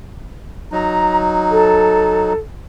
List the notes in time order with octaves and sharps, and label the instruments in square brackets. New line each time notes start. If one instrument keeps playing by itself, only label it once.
[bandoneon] F#3 D#4 [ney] A#5
[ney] A4